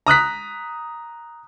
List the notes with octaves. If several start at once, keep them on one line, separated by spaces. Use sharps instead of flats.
A#5 D#6 F#6 B6